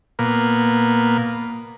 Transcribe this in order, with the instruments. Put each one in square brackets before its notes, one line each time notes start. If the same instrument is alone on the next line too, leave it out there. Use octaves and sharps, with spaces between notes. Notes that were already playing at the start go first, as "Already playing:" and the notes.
[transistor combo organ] A#2 A#3 B3